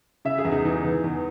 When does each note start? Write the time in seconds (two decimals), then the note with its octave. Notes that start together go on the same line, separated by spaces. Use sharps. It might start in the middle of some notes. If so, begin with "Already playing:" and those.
0.25 C#3 E5
0.38 G#4
0.45 E2
0.52 D#4
0.65 E3 D#4
0.84 E3
1.04 E2